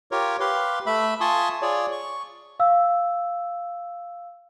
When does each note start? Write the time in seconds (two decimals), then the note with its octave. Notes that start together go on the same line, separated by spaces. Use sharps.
0.12 F4 G4 A#4 C#5
0.40 G4 B4 F5 C6
0.86 A3 E5 B5
1.21 F4 G#5 A5 C6 C#6 D#6
1.62 F4 G#4 C#5 D5
1.92 C#6
2.60 F5 E6